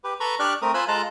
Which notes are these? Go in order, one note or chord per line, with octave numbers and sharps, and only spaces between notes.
G4 B4
A4 B4 A#5 B5 C#6
D4 G4 D5 C#6 F6 F#6
A3 C4 A#4 D#6
F4 C5 G#5 B5 E6 F#6
G#3 F4 A4 A5 A#5 F#6